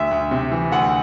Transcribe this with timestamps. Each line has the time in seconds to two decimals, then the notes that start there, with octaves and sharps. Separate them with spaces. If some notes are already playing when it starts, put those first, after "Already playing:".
Already playing: D2 E5
0.11 D2
0.31 C3
0.51 E3
0.72 D2 F#5